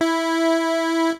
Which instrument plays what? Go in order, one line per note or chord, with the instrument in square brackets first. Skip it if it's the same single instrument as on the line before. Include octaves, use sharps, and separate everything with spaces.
[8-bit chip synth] E4